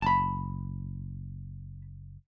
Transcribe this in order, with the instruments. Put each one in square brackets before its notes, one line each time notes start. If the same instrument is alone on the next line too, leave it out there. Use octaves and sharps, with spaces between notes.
[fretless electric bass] F#1 [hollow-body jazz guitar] A5 B5